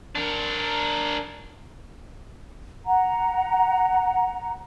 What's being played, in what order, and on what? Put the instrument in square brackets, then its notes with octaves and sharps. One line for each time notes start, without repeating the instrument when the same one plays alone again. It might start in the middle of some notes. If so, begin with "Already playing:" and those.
[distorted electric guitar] D4 A#4
[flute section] F#5 A#5